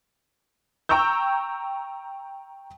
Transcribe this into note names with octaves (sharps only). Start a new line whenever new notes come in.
G5 A#5 C#6 E6 G6